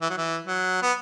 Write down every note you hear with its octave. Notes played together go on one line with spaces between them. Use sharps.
E3
F#3
E3
F#3
B3